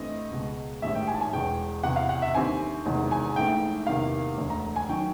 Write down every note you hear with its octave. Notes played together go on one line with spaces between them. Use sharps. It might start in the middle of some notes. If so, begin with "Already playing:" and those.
Already playing: G2 E3 A3 C4 E4 D#5
C#2 B2 G#3
A1 G#2 D#3 G3 E5
G5
G#5
A5
G#5
E1 E2 B2 G#3 G5
E2 C3 E3 F#5
F5
F#5
E5
D#2 D3 G3 C4 G#5
E1 E2 C3 D#3 G#3
G#5
A#1 G#2 E3 A3 G5
E2 C3 D#3 G3 A#3 F5
E1 D2 D3
A#5
G#5
D#3 F#3 G5